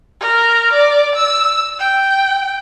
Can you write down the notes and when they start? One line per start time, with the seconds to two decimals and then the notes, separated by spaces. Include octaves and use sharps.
0.20 A#4
0.73 D5
1.15 E6
1.79 G5